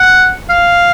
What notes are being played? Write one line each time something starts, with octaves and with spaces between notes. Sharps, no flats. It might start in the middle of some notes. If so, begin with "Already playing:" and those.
Already playing: F#5
F5